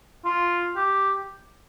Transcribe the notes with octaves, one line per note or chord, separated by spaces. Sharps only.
F4
G4